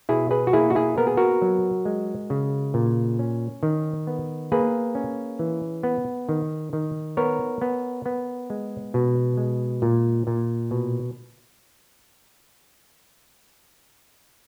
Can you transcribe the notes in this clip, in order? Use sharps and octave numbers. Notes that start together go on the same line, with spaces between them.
B2 E4 G#4
G#4 B4
F#4
A#3 E4 G#4
F#4
E4 G#4
B3 A#4
G#4
F#4 A#4
F#3
G#3
C#3
A#2
C#4
D#3
B3
A#3 G#4 B4
C#4
E3
B3
D#3
D#3
B3 A#4 C#5
B3
B3
G#3
B2
G#3
A#2
A#2
B2